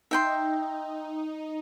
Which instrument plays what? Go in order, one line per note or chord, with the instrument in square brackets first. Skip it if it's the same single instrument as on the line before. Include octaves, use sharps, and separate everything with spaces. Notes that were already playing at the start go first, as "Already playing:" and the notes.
[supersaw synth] D#4 [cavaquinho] E5 G5 C6